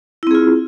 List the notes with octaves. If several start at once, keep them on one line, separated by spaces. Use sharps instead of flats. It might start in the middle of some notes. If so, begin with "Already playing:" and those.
C4 E4 F4 G#4